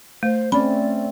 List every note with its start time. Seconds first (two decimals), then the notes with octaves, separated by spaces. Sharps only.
0.23 A3 C5
0.52 A3 C4 C#4 D5 B5